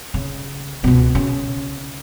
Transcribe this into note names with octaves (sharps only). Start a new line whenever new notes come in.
C#3
C#2 B2
C#3